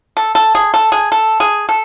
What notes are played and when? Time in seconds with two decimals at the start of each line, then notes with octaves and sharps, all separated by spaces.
0.17 A4
0.35 A4
0.55 G#4
0.74 A4
0.92 G#4
1.12 A4
1.40 G#4
1.69 A4